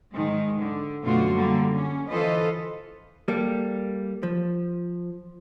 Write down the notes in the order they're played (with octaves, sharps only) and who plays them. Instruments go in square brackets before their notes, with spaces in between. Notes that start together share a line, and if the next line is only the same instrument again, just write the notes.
[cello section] G#2 D#3 G#3
D3
F#2 B2 D3 A3 F4 F#4
D3 G3 A#3
C#4
E3 F4 A4 B4 C5 D#5
[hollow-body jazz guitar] G3 A#3 G4 A4
F3